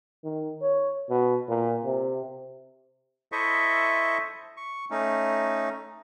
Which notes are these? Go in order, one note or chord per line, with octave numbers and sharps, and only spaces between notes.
D#3
C#5
B2
A#2
C3
E4 A4 C5 D#5 E5 C#6
C#6
A3 C#4 D#4